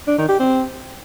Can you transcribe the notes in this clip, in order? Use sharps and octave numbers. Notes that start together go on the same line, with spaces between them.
D4
D#3
G4
C4